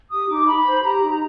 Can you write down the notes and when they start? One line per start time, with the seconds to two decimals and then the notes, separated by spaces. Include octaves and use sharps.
0.10 G4 D#6
0.28 D#4 D6
0.46 D#4 B5
0.65 C5
0.83 G4 A#5
1.01 D#4